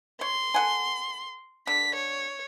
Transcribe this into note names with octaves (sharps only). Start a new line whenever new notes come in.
C#5 C6
A4 F#5 G#5
D3 B6
C#5